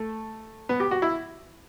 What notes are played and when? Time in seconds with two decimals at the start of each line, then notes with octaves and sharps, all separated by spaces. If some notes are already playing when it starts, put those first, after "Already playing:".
Already playing: A3
0.69 B3
0.80 G4
0.91 F#4
1.02 E4